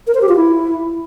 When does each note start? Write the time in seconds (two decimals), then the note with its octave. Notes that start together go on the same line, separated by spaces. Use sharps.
0.07 A#4
0.14 C5
0.22 G4
0.29 F4
0.36 E4